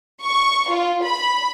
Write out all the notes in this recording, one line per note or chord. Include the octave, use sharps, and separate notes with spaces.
C#6
F4
B5